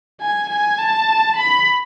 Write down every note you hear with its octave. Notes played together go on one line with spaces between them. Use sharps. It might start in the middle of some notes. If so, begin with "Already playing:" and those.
G#5
G#5
A5
B5